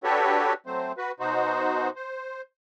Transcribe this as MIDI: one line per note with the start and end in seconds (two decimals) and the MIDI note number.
0.04 0.53 62
0.04 0.53 66
0.04 0.53 67
0.04 0.53 69
0.04 0.53 71
0.04 0.53 73
0.66 0.92 54
0.66 0.92 57
0.66 0.92 60
0.66 0.92 72
0.97 1.12 66
0.97 1.12 71
1.20 1.90 47
1.20 1.90 63
1.20 1.90 66
1.20 1.90 72
1.96 2.42 72